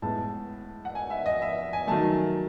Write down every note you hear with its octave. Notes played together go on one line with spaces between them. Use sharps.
A2 G#3 B3 A5
F#5
G#5
E5
D#5
E5
G#5
D#3 F#3 A3 A5